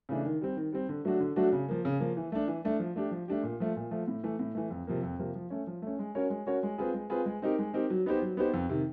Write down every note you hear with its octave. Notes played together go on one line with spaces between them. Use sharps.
C#3 E3 A3 D4
D#3
G3 C4
D#3
G3 C4
D3
F#3 A3 D4 F#4
D3
F#3 A3 D4 F#4
C#3
F3 A#3
C#3
F3 A#3
E3
A3 D4
E3
A3 D4
F3
A3 D4 G4
F3
A3 D4 G4
A#2
F3 A3
A#2
F3 A3
A2
E3 A3
A2
E3 A3
F2
C3 F3 A#3
F2
C3 F3 A#3
F3
A3 C#4
F3
A3 C#4
G#3
C#4 F#4 A#4 C#5
G#3
C#4 F#4 A#4 C#5
G#3
C4 F4 G#4 B4
G#3
C4 F4 G#4 B4
G#3
C4 D#4 G4 A#4
G#3
C4 D#4 G4 A#4
F#3
B3 D#4 G4 C5
F#3
B3 D#4 G4 C5
F2
C3 D#3